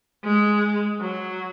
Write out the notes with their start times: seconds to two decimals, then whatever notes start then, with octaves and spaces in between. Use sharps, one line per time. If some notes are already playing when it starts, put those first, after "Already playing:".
0.24 G#3
1.01 F#3